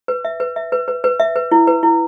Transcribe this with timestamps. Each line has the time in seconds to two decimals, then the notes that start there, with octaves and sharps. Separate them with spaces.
0.08 B4
0.25 E5
0.40 B4
0.56 E5
0.72 B4
0.88 B4
1.04 B4
1.20 E5
1.36 B4
1.52 E4
1.67 B4
1.83 E4